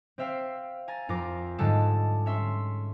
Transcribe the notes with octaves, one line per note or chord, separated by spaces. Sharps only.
C4 C5 E5 F5 G5
G#5 A#5 A6
F2 F4 A#4 D6
G#2 D3 G3 G#3 A4 A5
C#4 E5 C6